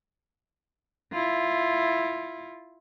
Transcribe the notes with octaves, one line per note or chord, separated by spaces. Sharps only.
E4 F4